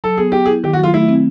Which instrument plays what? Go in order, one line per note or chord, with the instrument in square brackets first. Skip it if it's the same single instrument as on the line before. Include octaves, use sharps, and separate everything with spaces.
[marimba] F#3 [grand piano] A4
[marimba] B3 [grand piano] G#4
[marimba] B3 [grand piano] G4
[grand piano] G#4
[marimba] E4
[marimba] D#3 [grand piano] G4
[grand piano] F#4
[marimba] F#3 [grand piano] F4
[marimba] A3 [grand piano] E4
[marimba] C4